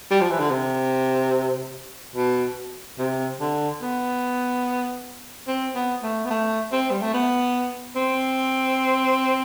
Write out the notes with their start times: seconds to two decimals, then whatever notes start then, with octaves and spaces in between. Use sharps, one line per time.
0.11 G3
0.21 F3
0.31 E3
0.40 D3
0.51 C3
2.15 B2
2.99 C3
3.40 D3
3.81 B3
5.47 C4
5.75 B3
6.03 A3
6.25 B3
6.30 A3
6.72 C4
6.91 G3
7.01 A3
7.14 B3
7.96 C4